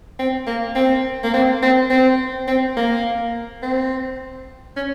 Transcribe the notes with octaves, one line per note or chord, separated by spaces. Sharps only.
C4
A#3
C4
A#3
C4
C4
C4
C4
A#3
C4
C#4